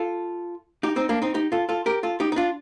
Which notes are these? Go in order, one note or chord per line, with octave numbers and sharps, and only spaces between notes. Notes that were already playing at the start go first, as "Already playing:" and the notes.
Already playing: F4 A4
D#4 G4
C4 D#4
A#3 D4
C4 D#4
D#4 G4
F4 A4
F4 A4
G4 A#4
F4 A4
D#4 G4
D#4
D4 F4